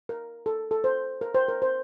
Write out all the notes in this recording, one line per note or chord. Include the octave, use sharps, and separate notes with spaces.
A#4
A4
A4
C5
A#4
C5
A#4
C5